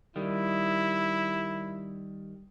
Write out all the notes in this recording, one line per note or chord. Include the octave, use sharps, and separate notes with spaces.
D#3 G3 E4